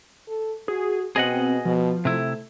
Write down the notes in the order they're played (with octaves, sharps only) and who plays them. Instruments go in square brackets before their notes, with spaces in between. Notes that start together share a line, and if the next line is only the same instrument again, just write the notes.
[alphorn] A4
[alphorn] F#4 [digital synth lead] G#4
[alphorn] B2 [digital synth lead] C4 [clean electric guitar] G#4 D#5 F#5
[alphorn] B2 [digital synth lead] F3
[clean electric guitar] C3 E4 [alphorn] A3